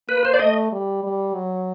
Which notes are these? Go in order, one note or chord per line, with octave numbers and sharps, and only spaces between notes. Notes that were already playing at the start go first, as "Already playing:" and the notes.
A#3 B4
C5
D5
A3 D#5
G3
G3
F#3